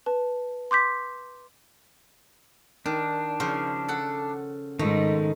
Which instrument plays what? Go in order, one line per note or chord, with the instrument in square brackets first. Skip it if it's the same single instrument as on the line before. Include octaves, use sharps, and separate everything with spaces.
[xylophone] B4 A5
C6 D6 G6 B6
[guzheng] D#3 [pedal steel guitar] D4
[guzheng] C#3 F3 C5
A4 F#5
[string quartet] G#2 [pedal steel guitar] D#3 D#4 [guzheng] A3